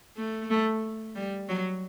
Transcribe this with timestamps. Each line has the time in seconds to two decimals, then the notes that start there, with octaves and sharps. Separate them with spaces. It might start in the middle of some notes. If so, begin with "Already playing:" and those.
0.17 A3
0.50 A3
1.16 G3
1.49 F#3